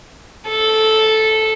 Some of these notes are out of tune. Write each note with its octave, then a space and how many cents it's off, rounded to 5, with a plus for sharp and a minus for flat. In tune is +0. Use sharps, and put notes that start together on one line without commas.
A4 -10